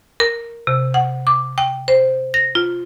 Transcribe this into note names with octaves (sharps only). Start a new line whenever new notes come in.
A#4
C3
F#5
D6
G5
C5
A#6
F4